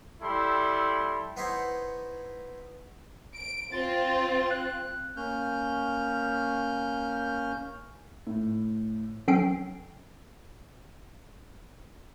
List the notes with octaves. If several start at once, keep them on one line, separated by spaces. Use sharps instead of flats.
G3 E4 A4 C6
B3 D#4 E4 C5 C#5
D7
C4 F4 A6
F#6
A#3 C#4 F6 G6
A2
F#3 C#4 A4 G5 C7 D7